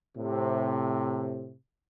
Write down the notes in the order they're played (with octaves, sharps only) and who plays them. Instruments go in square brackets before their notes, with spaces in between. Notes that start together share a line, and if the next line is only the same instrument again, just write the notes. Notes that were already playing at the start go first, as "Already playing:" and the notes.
[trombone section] A2 C3